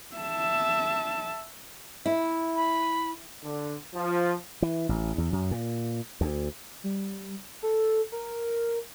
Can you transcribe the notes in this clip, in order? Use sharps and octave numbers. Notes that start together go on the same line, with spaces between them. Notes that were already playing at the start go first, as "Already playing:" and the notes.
E5 A5
E4
B5
D3
F3
E3
A1
E2
F#2
A#2
D2
G3
A4
A#4